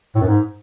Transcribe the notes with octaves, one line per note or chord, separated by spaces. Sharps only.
A2
F#2
G#2